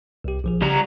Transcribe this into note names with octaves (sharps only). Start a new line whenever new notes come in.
C2 G4
A#1 F3 G#4
C#3 G3 G4 A#5